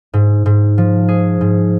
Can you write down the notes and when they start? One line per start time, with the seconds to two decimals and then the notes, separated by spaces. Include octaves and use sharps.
0.13 G#2
0.46 G#2
0.78 F3
1.08 G#4
1.41 G#2